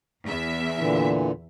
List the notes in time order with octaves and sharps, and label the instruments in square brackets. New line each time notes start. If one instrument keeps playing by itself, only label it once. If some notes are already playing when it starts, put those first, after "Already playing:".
[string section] E2 E5
[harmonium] A#2 D3 E3